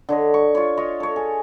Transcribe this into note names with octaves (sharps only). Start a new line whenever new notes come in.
D3 C#5 D#5
C#6
F4 C#5
F4 C#5 D#5
A4 C#5
G#4